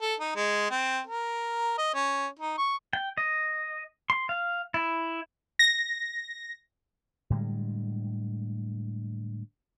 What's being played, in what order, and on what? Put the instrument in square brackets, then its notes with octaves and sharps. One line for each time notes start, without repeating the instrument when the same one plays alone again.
[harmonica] A4
D#4
G#3
C4
A#4
D#5
C#4
D#4
C#6
[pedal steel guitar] G5
D#5
C6
F5
E4
[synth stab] A#6
[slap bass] A2 D3 G3 G#3